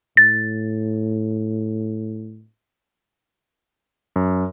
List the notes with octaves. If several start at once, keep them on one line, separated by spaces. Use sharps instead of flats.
A2 A6
F#2